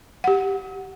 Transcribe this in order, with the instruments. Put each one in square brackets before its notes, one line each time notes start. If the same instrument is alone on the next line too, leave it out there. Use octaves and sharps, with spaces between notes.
[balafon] G4 F#5